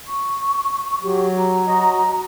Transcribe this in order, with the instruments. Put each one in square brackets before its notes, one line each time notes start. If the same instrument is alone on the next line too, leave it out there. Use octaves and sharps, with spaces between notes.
[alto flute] C#6
[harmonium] F#3 [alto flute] G4
[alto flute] A#5
[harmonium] F#4 D#5